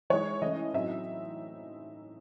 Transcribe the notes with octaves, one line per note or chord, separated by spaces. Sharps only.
E3 G#3 D#4 C#5
E3 A3 C#4 E4 D#5
A2 F#3 C4 D#4 E5